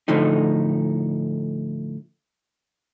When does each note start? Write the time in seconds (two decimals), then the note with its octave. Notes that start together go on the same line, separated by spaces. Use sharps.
0.08 A2 D3 F3 A3 D#4